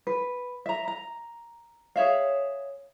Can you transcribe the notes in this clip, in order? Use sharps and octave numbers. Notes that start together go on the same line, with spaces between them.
B4
E5 A#5
A#5
G#4 C#5 E5 F5